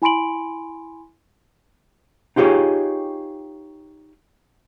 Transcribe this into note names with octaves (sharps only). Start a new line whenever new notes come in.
E4 G#5 B5 C6 D7 F#7
D#4 F4 G4 G#4 C#5